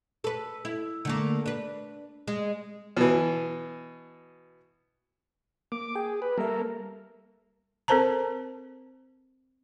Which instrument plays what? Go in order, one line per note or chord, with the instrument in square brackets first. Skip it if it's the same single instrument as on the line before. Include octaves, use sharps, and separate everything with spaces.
[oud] A4 B4
E4
D3 A3 A#3
D4 B4
G#3
[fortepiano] B2 E3
[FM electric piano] A#3 [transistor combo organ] D6
[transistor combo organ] G#4 [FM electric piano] G5
[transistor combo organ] B4
[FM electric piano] G3 E5 [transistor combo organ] A#3 A4 A#4
[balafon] C4 A4 A#4 C5 A5 A#5